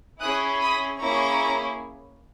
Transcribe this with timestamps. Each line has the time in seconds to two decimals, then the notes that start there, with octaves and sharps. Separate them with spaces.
0.20 C#4 E4 G#4 D#6 F#6
0.60 B5 D#6
1.00 A#3 C#4 E4 G#4 A#5 C#6